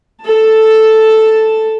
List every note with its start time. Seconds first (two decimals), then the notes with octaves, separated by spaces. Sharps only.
0.25 A4 A5